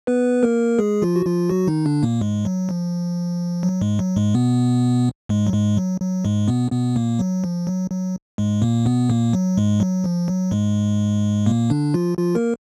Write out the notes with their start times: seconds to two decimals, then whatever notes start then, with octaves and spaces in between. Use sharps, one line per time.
0.07 B3 B4
0.43 A#3 A#4
0.79 G#3 G#4
1.02 F3 F4
1.16 F#4
1.26 F3 F4
1.50 F#3 F#4
1.67 D#3 D#4
1.86 D3 D4
2.03 A#2 A#3
2.21 G#2 G#3
2.45 F#3
2.69 F3
3.63 F#3
3.81 G#2 G#3
3.99 F#3
4.16 G#2 G#3
4.34 B2 B3
5.29 G#2 G#3
5.47 F#3
5.53 G#2 G#3
5.77 F#3
6.01 F#3
6.25 G#2 G#3
6.48 B2 B3
6.72 B2 B3
6.96 A#2 A#3
7.19 F#3
7.44 F3
7.67 F#3
7.91 F#3
8.38 G#2 G#3
8.62 A#2 A#3
8.86 B2 B3
9.09 A#2 A#3
9.33 F#3
9.57 G#2 G#3
9.80 F#3
10.04 F3
10.28 F#3
10.51 G#2 G#3
11.46 A#2 A#3
11.70 D3 D4
11.94 F3 F4
12.18 F3 F4
12.35 A#3 A#4